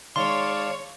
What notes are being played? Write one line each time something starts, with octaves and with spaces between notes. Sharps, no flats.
D#3 G#3 C#5 D5 F5 A5 C6